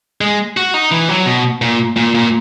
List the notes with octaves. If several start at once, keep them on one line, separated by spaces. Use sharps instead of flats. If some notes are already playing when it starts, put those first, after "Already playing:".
G#3
F#4
D#4
E3
F#3
B2
A#2
A#2
A#2